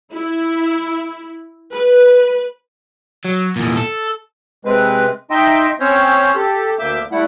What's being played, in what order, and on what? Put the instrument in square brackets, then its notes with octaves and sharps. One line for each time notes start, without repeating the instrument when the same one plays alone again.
[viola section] E4
B4
[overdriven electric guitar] F#3
E2 A#2
A4
[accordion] C3 G#3 C4 B4
D#4 D#5 E5 G5 C6
C4 C#4 C5 C#5
G4 A4
D2 A#3 E5 D6 E6 G6
G3 A3 E4 F#5